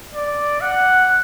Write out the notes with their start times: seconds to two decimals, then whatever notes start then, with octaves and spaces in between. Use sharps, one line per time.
0.14 D5
0.61 F#5